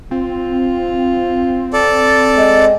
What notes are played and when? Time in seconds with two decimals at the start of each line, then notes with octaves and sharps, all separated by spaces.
0.11 C4 F4
1.73 A4 D5
2.36 G#3 D#5